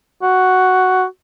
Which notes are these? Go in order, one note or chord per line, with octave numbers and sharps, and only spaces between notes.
F#4